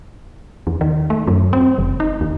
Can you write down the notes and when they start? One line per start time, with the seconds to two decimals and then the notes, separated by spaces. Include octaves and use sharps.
0.67 E2
0.81 D#3
1.10 A3
1.27 F#2
1.53 C4
1.78 F1
2.00 D#4
2.21 D#2